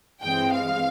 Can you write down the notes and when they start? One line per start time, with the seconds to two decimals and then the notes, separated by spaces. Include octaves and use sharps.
0.22 G2 E3 G#3 C4 G5
0.52 F5